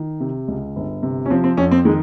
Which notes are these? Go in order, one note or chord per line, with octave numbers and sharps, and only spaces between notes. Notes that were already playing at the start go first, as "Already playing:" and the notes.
Already playing: D#3
C3
C#2
G1
C3
C#4
F3 C4
C4
F2 C#4
C4
D#3 G#3